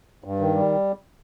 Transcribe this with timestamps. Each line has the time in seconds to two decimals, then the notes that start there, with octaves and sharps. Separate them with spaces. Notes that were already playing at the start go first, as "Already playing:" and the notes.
0.24 G2
0.39 D#3
0.55 G3